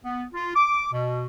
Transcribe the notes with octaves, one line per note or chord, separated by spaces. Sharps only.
B3
F4
D6
B2